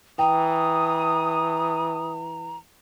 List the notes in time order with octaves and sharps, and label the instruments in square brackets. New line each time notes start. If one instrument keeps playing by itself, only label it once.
[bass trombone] E3 [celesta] G5 [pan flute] A#5 [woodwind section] D#6